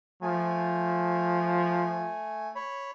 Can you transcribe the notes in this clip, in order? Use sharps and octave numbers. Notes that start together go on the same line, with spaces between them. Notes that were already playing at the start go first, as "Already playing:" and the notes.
F3 A3 G#5
C#5 B5